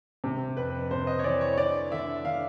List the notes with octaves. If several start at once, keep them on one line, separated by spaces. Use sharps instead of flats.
C3
F2 B4
C3 C5
D#5
C#5
E3 D5
C#5
C#5
D3 D5
D3 E5
D3 F5